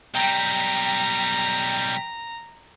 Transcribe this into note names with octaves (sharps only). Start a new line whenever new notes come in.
B1 G3 G5 A#5 B6